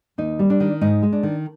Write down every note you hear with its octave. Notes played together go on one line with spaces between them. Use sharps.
D#2 D#4
G3
D4
D#3
G#2 D#4
G#3
D4
D#3